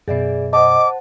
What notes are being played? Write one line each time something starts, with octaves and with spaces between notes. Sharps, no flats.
F#2 B2 G#4 D5 E5
C5 D#5 F#5 A5 D6